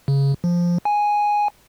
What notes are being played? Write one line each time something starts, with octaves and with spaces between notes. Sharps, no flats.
C#3
F3
G#5